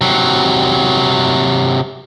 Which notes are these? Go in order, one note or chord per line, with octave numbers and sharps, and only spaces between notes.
C3 F#3